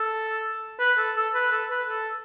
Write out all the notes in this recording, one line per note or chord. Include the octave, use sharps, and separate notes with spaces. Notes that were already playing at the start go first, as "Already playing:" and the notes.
Already playing: A4
B4
A4
A4
B4
A4
B4
A4